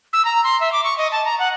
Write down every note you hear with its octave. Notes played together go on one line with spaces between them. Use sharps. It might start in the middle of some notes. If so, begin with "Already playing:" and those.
E6
A#5
C6
E5
D6
C#6
D#5
A5
A#5
F#5